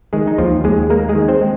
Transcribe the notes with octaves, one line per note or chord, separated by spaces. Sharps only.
D#3 G#3 G#4
D#4
D#2 F3 F4
D#2 G#3 G#4
G#3 A#3 A#4
G#3 G#4
D#3
C4 C5
G#3